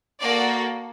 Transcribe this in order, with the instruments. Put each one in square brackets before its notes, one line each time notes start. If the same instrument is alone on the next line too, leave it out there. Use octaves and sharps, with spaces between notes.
[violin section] A#3 F#4 A4 D5